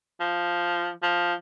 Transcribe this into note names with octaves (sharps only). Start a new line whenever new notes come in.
F3
F3